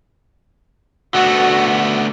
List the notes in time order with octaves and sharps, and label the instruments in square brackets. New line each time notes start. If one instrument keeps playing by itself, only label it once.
[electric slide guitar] D3 A3 B3 [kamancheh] F#4